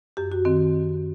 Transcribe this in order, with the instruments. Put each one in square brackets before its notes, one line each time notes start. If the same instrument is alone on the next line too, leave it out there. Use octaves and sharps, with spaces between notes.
[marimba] F#2 G4
F#4
D#3 C4